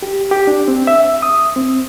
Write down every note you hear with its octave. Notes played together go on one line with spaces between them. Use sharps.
G4
G4
D4
C4
E5
D#6
C4